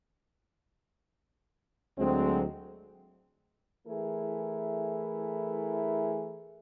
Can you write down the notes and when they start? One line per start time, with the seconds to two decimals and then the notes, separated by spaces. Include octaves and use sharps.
1.99 D2 F#3 G#3 C4
3.88 E3 A3 E4 G#4 A#4